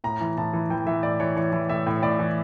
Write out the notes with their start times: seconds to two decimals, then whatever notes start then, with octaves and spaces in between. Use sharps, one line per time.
0.04 A2 A#5
0.21 E3
0.37 A2 A5
0.53 E3
0.70 E3 G5
0.87 E3 E5
1.03 A2 D5
1.20 E3 C#5
1.37 E3 C#5
1.53 E3
1.69 A2 E5
1.86 A2
2.02 A2 D5
2.19 E3